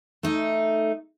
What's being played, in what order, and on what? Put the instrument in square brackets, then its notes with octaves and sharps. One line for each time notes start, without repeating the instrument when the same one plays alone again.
[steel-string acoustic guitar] A3 D#4